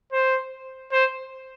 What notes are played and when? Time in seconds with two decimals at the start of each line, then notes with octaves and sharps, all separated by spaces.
0.12 C5
0.92 C5